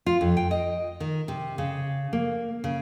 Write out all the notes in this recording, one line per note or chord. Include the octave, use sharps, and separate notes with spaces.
F4
F2
G5
D#5
D#3
C3
C#3
A#3
C#3